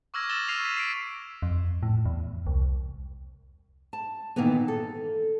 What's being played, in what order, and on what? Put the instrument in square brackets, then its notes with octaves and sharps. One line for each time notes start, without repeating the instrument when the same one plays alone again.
[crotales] C#6 D6 E6 F6 G#6 A#6
D6 E6 A6 E7 G7
C#6 F6 C7 D#7 F7
B6
C7 D7
[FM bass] F2
A2
E2
C2
[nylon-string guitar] A5
A#2 D#3 E3 A#3 B3
A4